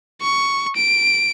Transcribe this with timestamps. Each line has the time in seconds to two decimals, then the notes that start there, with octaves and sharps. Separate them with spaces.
0.21 C#6
0.76 D7